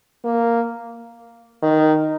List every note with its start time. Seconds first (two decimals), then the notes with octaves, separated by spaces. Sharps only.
0.25 A#3
1.63 D#3